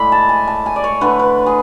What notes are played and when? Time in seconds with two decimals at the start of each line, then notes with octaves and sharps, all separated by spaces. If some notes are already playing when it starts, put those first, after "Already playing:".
Already playing: A2 G#3 D5 B5
0.12 A5
0.29 G#5
0.47 A5
0.66 G#5
0.76 D5
0.84 C#5
1.01 D3 A3 B4
1.19 B4
1.46 G#4